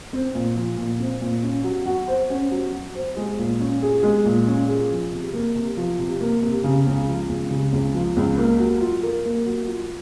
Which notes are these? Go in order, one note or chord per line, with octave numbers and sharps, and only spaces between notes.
C4
A#2
F3
A#2
C4
A#2
C#4
F#3
F#4
C5
C#4
F#3
F#4
C5
G#3
A#2
C#4
G#4
G#3
A#2
C#4
G#4
F3
C3
A#3
C3
F3
C3
A#3
C3
C#3
C#2
F3
C#2
C#3
C#2
F3
C#2
A#3
F#3
F4
A#4
A#3
F#3
F4